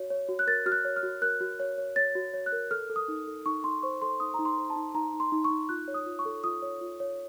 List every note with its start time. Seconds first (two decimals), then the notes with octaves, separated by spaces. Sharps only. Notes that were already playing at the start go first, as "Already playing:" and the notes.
Already playing: F#4 C#5
0.10 C#5
0.29 F#4
0.39 F#6
0.47 A#4 A6
0.66 F#4 F6
0.72 F#6
0.85 C#5
0.96 F6
1.03 F#4
1.22 A#4 F#6
1.41 F#4
1.60 C#5
1.78 C#5
1.96 C#5 A6
2.15 F#4
2.34 C#5
2.46 F#6
2.52 A#4
2.71 A4 F6
2.90 A4
2.96 D#6
3.08 D#4
3.27 A4
3.46 D#4 C#6
3.64 D#4 C6
3.83 C5 C#6
4.02 A4 C6
4.20 D#4 D#6
4.34 D#4 A#5
4.45 C6
4.58 C5
4.70 A5
4.76 D#4
4.95 D#4 A#5
5.13 D#4
5.20 C6
5.32 D#4
5.44 C#6
5.50 D#4
5.69 F4 F#6
5.88 C#5
5.94 D#6
6.06 F4
6.19 C#6
6.25 A4
6.44 F4 D#6
6.62 C#5
6.81 F4
7.00 C#5